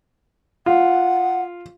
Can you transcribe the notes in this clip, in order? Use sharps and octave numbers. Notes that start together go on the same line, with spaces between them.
F4 F#5